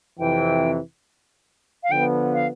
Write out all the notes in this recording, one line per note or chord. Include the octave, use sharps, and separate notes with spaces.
F2 C3 E3 G5
F5
D3 F3 B3 G5
F5